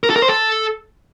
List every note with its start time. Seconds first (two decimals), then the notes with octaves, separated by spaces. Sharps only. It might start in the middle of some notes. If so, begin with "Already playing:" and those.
0.03 A#4
0.10 A4
0.16 A#4
0.22 C5
0.28 A4